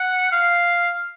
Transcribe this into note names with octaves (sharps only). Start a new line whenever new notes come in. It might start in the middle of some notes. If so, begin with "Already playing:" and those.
Already playing: F#5
F5